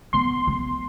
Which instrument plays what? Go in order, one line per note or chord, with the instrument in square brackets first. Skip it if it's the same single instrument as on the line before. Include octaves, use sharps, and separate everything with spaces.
[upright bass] B3 [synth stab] C6
[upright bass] B3